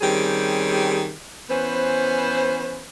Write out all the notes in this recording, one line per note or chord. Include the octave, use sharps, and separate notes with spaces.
D#3 G3 C4 C#4 G4 G#4
E3 B3 C#4 B4 C5